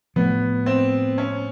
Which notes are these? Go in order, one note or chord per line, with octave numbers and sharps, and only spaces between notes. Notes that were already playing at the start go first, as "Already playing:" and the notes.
A2 F3 A3 B3
C4
C#4